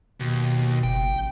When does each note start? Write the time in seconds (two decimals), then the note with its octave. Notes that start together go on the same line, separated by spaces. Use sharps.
0.20 D#2 B2
0.84 F#1 G5
1.14 A1